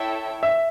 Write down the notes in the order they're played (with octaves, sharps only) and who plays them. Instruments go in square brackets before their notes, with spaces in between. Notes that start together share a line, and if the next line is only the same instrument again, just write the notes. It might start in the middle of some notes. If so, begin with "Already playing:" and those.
Already playing: [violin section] E4 A4 C#5 E5 G5
[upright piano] E5